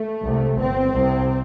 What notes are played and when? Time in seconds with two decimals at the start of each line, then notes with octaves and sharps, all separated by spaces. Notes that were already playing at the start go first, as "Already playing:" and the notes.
Already playing: A3
0.22 C2 C3
0.58 G1 G2 C4
0.94 C2 C3